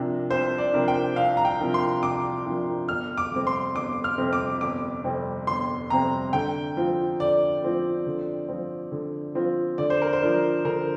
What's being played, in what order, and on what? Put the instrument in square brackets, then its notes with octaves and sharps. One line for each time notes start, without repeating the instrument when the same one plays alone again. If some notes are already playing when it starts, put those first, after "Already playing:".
Already playing: [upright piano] C2 C3 F3 D4 A#4
[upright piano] C2 [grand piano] C5
[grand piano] D5
[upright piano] C3 F3 D4 A#4
[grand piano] G5
[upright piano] C2 [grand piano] F5
[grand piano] A#5
G5
[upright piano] C3 F3 D4 A#4
[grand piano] C6
[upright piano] C2 [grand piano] D6
[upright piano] C3 F3 D4 A#4
[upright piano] G1 [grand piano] F6
[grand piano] D6
[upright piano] F2 C3 G3 C4
[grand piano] C6
[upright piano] G1 [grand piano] D6
[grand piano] F6
[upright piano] F2 C3 G3 C4
[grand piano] D6
[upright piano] G1 [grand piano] D6
[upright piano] F2 C3 G3 C4
[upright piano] G1 [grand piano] C6
[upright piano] F2 C3 G3 C4 [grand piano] A#5
[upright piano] D3 [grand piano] G5
[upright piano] F3 C4 F4
[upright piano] D3 [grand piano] D5
[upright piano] F3 C4 F4
D3
F3 C4 F4
D3
F3 C4 F4
[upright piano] D3 [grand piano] D5
[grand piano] C5
A#4
C5
[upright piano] F3 D4 A#4 D5
[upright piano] D3 [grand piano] A#4